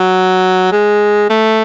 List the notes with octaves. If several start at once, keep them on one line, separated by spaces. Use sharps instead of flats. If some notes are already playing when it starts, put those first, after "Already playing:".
Already playing: F#3
G#3
A3